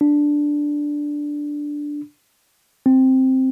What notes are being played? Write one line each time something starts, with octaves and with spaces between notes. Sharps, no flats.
D4
C4